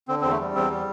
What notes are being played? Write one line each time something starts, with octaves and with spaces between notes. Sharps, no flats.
D3 C4
E2 C4
A3
G3
E2 C4
G3